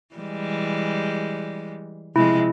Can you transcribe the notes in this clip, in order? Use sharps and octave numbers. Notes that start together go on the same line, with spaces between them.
E3 G3 G#3
C3 F3 G#3 E4